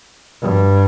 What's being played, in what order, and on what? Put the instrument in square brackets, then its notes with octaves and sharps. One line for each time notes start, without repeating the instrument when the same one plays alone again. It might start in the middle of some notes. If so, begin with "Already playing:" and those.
[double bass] G2